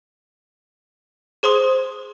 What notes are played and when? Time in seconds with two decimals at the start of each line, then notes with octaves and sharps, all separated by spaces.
1.43 G#4 C5 C6 D#6